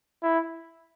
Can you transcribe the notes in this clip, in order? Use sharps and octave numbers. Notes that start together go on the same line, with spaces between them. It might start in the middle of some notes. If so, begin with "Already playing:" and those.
E4